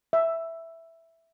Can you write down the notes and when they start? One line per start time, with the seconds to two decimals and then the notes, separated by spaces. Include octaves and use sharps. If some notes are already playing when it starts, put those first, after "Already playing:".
0.13 E5